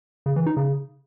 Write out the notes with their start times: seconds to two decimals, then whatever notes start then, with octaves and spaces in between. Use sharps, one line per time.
0.26 C#3
0.36 E3
0.46 D#4
0.57 C#3